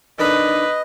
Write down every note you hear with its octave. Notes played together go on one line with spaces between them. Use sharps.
D#3 D4 A4 B4 D#5